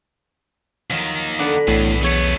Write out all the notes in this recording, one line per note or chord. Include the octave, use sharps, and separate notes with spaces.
D#2 D#3 F3 F#3
D3 B3 D4 D5 F#5 D6
B1 E2 A2 D#5 F#5 A5
E2 A3 B3 C#5 C#7